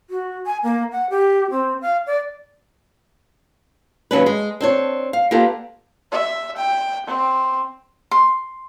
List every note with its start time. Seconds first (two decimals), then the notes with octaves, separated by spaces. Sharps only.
0.10 F#4
0.46 G#5
0.63 A#3
0.92 F#5
1.10 G4
1.51 C4
1.82 F5
2.07 D5
4.11 D#2 B2 F#3 C#4 D4 B4
4.26 G#3
4.61 C4 D4 C#5
5.13 F5
5.31 A#3 B3 D4 F4 G4 A4
6.12 E5
6.58 G5
7.07 C4
8.11 C6